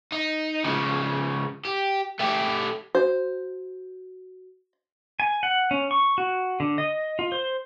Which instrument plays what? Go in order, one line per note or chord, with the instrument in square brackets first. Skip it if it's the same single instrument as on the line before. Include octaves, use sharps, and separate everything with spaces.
[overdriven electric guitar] D#4
C#3 F3
G4
A3 G4
[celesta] F#4 [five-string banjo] C5
[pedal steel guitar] G#5
F#5
C#4
C#6
F#4
D3
D#5
F4
C5